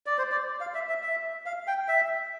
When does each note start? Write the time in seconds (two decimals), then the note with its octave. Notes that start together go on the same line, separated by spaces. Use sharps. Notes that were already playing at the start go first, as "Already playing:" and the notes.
0.06 D5
0.18 C5
0.31 D5
0.61 F5
0.74 E5
0.89 E5
1.03 E5
1.46 F5
1.67 G5
1.88 E5